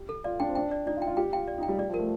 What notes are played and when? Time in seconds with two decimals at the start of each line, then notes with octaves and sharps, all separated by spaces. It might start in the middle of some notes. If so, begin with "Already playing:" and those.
Already playing: G4
0.09 A4
0.24 F4 D5
0.40 D4 G5
0.49 C4
0.55 D4 G5
0.71 D5
0.87 D#4 D5
0.97 F4
1.02 G5
1.07 F4
1.17 G4 G5
1.33 F4 G5
1.48 D5
1.58 D#4
1.63 G5
1.68 G3
1.78 G3 D5
1.89 F3
1.94 A#4
1.99 A3